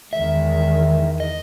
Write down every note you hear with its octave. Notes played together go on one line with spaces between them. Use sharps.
E2 D#3 G#3 E5
D#5